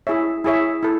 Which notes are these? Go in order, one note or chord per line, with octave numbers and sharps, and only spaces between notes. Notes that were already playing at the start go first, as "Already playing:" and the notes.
E4 G#4 C#5 E5
E4 G#4 C#5 E5
E4 A4